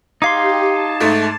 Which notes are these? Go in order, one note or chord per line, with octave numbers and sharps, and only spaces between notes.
D#4 G4 F5 C6 D6 G#6 C7
A5
G#2 A3 A6